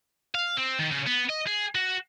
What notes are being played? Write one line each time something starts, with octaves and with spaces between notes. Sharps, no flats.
F5
C4
D#3
C#3
B3
D#5
G#4
F#4